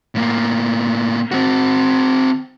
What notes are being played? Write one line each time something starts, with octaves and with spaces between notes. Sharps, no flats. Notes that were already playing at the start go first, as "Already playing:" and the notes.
A2 A#3
C4 F#4